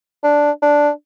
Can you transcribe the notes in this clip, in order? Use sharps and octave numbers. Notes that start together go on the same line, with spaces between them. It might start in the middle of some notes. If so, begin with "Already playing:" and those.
D4
D4